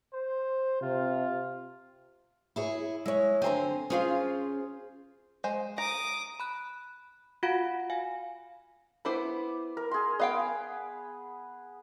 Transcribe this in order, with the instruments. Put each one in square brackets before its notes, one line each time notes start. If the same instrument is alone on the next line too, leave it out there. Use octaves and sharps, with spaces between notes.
[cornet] C5
[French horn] C3 [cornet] F4
[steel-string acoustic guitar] E4 G#4 C#5
[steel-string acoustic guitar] G#3 [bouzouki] E4 C#5
[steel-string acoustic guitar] D3 C5 G#5 [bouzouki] C4 A#5
[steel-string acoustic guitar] C#4 F4 [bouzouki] G#4 C5 F5
[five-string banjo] G#3 C5
[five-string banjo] A#5 [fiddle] D6 D#6
[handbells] B5 F#6
F4 F#4 F5 F#5 B5 D7
F5 G#5
[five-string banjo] B3 E4 C5 [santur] B5 D6
[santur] A#4
G#4 C6
[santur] B3 [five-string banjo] D#5 F5 G5